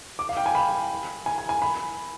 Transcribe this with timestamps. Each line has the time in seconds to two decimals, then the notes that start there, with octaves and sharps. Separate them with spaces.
0.19 D6
0.29 F5
0.37 G5
0.46 G#5
0.55 B5
1.26 G#5
1.38 G#5
1.49 G#5
1.62 B5